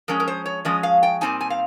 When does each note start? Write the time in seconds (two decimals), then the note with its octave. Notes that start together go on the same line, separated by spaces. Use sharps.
0.08 F3 G#3 C#4 A#4
0.20 A#4
0.28 C5
0.46 C#5
0.65 F3 G#3 C#4 D#5
0.83 F5
1.03 G5
1.21 A#2 G3 C4 D#4 G#5
1.41 G#5
1.50 F5